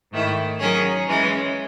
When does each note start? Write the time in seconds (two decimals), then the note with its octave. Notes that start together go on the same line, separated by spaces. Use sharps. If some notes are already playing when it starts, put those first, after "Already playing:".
0.11 G#2 D#3 A3 E4
0.59 D#3 F#3 C#4 G#4 C#5
1.07 E3 G#3 C#4